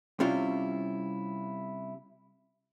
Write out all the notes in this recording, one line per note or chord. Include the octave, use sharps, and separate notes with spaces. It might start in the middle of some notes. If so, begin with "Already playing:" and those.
C3 G3 C#4 E4 F4